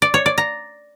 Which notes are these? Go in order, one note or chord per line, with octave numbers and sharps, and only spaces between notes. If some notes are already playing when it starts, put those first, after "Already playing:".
D5
C#5
D5
A#5